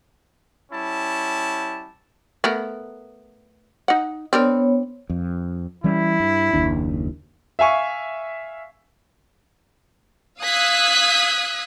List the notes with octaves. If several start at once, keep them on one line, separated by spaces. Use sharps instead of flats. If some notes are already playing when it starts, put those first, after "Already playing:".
G3 C#4 E4 A5
A3 B3 A#4
D#4 F#5
B3 C4 D4 A#4 C#5
F2
E3 G3 C#4 E4
G2
F#1 D#2 D4
E5 F5 G#5 C#6
F5 D#6 E6 F#6 G#6 B6